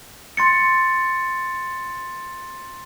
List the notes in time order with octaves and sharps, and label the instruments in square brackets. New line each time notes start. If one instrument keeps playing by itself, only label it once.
[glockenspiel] C6 A6 C#7